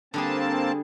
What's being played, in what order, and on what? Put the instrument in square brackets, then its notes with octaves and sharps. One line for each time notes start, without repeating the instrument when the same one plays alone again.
[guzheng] D3 G3 G#4 [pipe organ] A#3 C4 A5